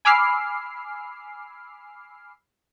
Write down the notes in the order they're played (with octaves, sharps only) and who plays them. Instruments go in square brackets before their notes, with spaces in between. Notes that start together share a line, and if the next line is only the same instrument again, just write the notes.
[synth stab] G#5 B5 D6 E6 F6 C7